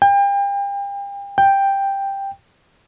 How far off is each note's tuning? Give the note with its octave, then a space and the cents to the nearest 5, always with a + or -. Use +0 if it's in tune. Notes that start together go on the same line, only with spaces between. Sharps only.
G5 +35
G5 +5